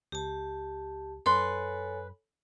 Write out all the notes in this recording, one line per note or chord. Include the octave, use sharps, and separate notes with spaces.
C#2 G4 A5
F#2 A4 B4 C#5 G#5 C6